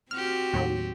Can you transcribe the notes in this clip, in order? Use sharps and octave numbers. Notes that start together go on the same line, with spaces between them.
C4 F#4 G4 F6
D#2 A2 F#3